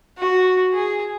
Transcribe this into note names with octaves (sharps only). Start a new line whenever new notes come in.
F#4
G#4